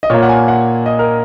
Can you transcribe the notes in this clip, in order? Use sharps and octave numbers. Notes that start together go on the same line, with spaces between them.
D#5
A#2 A#3 C#5
F#5
G#5
F#5
D#5
A#4